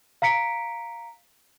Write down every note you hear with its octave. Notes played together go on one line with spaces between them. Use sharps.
F5 A#5 B6 C#7 D7